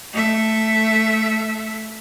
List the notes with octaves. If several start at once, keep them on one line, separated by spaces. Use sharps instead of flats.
A3 E5